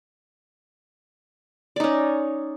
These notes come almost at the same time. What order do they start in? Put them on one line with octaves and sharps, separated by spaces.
D5 D#4 C#4